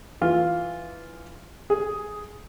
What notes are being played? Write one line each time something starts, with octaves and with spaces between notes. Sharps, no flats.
E3 F4
G#4